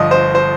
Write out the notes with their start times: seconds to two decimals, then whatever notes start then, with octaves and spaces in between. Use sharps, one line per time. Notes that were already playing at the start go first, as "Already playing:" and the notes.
Already playing: G1 G2 F3 D#5
0.11 C5
0.35 C5